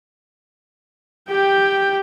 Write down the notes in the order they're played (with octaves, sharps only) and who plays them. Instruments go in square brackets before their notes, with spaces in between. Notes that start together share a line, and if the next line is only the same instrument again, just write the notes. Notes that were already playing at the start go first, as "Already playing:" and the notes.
[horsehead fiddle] G4 G5